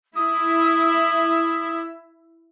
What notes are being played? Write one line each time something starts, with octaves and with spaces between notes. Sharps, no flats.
E4 E5 D#6